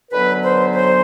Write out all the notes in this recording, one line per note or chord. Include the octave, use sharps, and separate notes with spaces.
F#2 D3 F#3 B3 B4
C5
C5